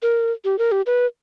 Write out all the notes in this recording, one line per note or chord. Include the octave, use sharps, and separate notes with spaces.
A#4
G4
A#4
G4
B4